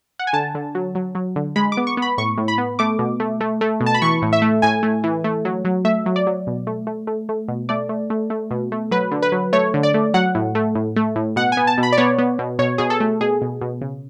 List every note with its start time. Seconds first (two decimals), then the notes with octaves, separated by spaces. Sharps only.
0.19 F#5
0.27 G#5
0.33 D3 A5
0.55 D3
0.75 F#3
0.95 F#3
1.15 F#3
1.36 D3
1.56 G#3 B5
1.72 D6
1.77 B3
1.87 C#6
1.97 B3
2.02 B5
2.18 A2 C#6
2.37 A2
2.48 B5
2.58 B3
2.79 A3 D6
2.99 B2
3.20 A3
3.40 A3
3.61 A3
3.80 B2
3.86 A5
3.94 B5
4.02 E3 C#6
4.22 A2
4.33 E5
4.42 A3
4.62 A2 G#5
4.83 A3
5.04 E3
5.24 A3
5.45 F#3
5.65 F#3
5.85 A3 E5
6.06 F#3
6.16 D5
6.27 F#3
6.47 B2
6.67 A3
6.87 A3
7.07 A3
7.29 A3
7.48 B2
7.69 A3 D5
7.89 A3
8.10 A3
8.30 A3
8.51 B2
8.72 A3
8.91 F#3 B4
9.12 D3
9.22 B4
9.32 F#3
9.53 A3 C#5
9.74 D3
9.83 D5
9.94 A3
10.14 F#3 F#5
10.35 A2
10.55 A3
10.75 A2
10.96 A3
11.16 A2
11.36 B2 F#5
11.52 B3 G#5
11.67 A5
11.78 B2
11.83 B5
11.92 D5
11.97 B3 C#5
12.18 B3
12.39 B2
12.59 B2 C#5
12.78 B2 G#4
12.90 A4
13.00 A3
13.21 B2 G#4
13.42 B2
13.61 B2
13.81 C#3